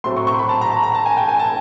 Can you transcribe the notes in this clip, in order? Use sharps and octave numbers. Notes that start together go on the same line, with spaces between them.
A2 F#3 A3 C4 C6
C#6
C#6
C6
B5
A5
A#5
A#5
A#5
A5
G#5
G5
G#5
A5